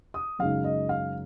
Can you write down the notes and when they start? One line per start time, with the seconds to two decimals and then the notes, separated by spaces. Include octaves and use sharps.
0.14 D#6
0.39 F#2 C#3 G#3 D#4 F5
0.64 D#5
0.89 F5